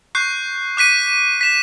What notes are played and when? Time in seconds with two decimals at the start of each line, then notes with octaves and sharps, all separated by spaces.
0.15 C#6 F#6 G6 C7
0.77 D6 F#6 B6 D#7
1.41 B6 E7